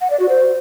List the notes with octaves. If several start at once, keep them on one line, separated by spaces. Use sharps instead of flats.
F#5
D5
F#4
C5